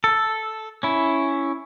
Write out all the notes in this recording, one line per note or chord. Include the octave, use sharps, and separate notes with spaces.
A4
C#4 E4